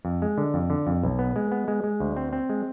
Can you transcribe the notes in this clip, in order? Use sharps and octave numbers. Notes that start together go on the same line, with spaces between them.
F2
G#3
D3
F2
D3
F2
B1
B3
G#3
B3
G#3
G#3
D2
C4
C4
G#3